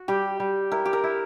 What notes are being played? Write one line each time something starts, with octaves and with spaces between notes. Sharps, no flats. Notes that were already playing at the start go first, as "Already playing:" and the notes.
Already playing: F#4
G3 G4
G3
E4 A#4
G4
A#4
E4